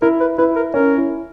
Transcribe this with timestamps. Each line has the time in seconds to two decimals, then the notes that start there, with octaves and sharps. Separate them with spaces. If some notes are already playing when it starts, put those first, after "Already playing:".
0.02 E4 A#4
0.20 B4
0.38 E4 B4
0.56 A#4
0.74 C#4 A#4
0.98 E4